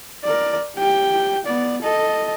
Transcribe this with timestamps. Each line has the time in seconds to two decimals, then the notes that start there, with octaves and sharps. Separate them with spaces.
0.24 A#4 D5
0.76 G4 G5
1.45 B3 D5
1.82 A4 D#5